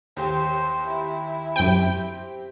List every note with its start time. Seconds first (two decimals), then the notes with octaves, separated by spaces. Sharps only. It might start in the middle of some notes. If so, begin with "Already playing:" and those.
0.17 D#2 G4 C5
0.87 E4
1.56 F#2 C4 G4 G5